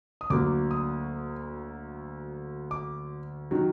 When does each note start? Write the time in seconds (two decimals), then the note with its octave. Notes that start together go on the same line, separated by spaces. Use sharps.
0.21 D#6
0.30 D2 D3 F#3 A#3 D6
0.71 D#6
2.71 D6
3.51 D#3 F#3